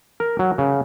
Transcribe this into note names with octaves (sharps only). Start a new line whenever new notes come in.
A#4
F#3
C#3